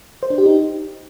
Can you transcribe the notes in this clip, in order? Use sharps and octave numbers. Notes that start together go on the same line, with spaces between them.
C5
D4
G4
D#4